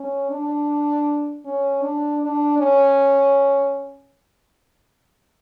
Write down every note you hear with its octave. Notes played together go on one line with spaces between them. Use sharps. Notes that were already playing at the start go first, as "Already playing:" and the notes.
Already playing: C#4
D4
C#4
D4
D4
C#4